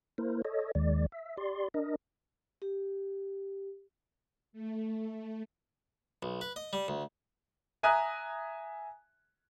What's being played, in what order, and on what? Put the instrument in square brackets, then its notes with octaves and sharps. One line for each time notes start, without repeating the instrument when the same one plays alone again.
[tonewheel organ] A#3 E4 A#4 C5
A4 C#5 D#5
D#2 D#3 G#3 D5
E5
G4 D5 C6
D4 A#4 D#5
[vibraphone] G4
[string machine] A3
[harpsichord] B1
B4
D#5
G3
D2
[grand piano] E5 G#5 A#5 D#6 F#6